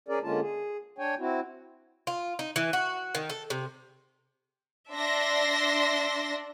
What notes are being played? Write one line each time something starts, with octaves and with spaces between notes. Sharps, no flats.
C#4 G#4 A#4 D5
D3 G#3 A#3 C#4 F4 A5
G#4
D4 C#5 G5 G#5
C4 E4 F#4
F4
D#4
E3
F#4
D#3
A4
C3
D4 E5 C6 A#6